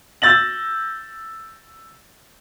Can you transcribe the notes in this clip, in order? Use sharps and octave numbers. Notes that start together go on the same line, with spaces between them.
E6 G6 A6 A#6 F#7